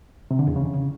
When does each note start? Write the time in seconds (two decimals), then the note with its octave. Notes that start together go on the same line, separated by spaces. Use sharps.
0.31 C3
0.39 D3
0.47 E2
0.56 C#3